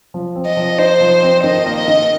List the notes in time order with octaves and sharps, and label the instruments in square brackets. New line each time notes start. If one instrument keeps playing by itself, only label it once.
[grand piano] F3
C4
[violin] D#5
[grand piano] F3
[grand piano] D#4 [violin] C5
[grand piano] F3
C4
[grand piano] D#3 [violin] D#5
[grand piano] A#3
[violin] D#5
[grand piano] D#3